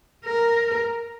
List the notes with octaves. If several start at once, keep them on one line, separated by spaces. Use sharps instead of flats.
A#4